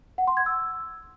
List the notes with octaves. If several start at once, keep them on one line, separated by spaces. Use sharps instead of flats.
F#5
C6
G#6
E6